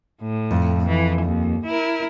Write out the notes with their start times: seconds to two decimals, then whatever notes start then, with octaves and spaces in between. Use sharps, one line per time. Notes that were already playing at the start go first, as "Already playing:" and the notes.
0.21 A2
0.51 F2
0.85 E3
1.21 D#2
1.65 E4 A#4